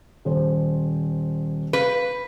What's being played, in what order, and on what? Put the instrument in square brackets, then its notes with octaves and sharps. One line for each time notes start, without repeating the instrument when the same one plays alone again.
[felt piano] D#1 C5
[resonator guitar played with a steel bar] B4 [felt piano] F5